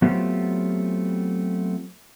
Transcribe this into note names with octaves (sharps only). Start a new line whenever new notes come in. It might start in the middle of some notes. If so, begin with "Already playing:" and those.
F#3 A3 B3 C4 F4 G4